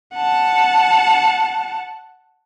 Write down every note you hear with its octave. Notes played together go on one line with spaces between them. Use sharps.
F#5 A5